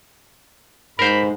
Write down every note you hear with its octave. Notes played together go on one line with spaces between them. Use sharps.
G#2 A#4 C5 B5